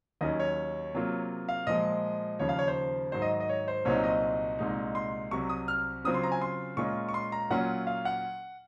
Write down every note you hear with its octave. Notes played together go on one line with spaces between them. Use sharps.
D#2 D#3 F#3 C#4 D#5
C#5
C3 F#3 A#3 F4
F5
A#2 F3 G#3 D#5
D#2 C#3 F3 C#5
F5
C#5
C5
G#2 D#3 F#3 C5
D#5
D#5
C#5
C5
C2 A#2 F#3 C4 D#4 C#5
D#5
C2 A#2 G#3 D#4
C6
C2 C3 F#3 C#6
D#6
F6
C#3 F#3 C4 F4 D#6
C6
A#5
G#5
C6
A#2 G#3 C#4 F4 C#6
C#6
C6
A#5
A#2 F#3 A#3 C#4 F4 F#5
F5
F#5